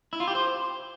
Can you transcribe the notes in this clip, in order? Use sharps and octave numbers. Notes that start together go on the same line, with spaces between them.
E4
F4
G4
C5